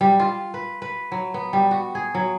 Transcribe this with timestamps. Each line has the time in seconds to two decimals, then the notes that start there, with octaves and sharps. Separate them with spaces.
0.01 G3
0.20 F4
0.54 B4
0.82 B4
1.12 F#3
1.34 B3
1.53 G3
1.71 F#4
1.95 G#4
2.15 F#3